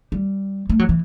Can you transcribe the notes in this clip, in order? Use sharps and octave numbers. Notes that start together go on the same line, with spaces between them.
G3
A3
F#3
E3